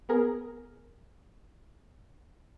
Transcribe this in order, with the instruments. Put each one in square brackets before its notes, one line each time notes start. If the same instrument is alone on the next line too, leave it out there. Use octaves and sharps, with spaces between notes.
[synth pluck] B3 G#4 A#4